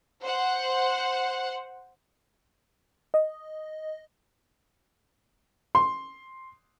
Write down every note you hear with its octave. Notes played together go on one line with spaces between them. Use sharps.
C5 F#5
D#5
C6